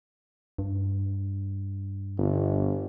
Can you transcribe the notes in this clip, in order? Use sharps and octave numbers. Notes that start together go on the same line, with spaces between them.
G2
G1